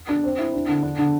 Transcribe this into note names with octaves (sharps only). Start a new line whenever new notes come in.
D4
C4
E4
D4
D3
D4
D3